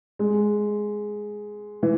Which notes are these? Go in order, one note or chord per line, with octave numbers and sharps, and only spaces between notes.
G#3
E3